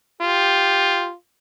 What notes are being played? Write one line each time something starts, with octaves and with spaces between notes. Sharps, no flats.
F4 G4